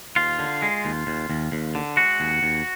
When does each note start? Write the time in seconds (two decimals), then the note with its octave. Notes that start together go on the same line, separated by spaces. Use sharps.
0.16 D#2 F4
0.39 D3
0.62 G#3
0.85 D#2
1.07 D#2
1.30 D#2
1.52 D#2
1.75 D3
1.97 G#3 F#4
2.20 D#2
2.43 D#2